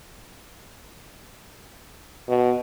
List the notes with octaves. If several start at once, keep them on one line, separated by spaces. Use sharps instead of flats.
B2